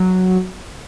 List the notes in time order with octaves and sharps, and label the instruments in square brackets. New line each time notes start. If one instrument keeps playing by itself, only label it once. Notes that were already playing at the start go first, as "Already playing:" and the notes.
Already playing: [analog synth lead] F#3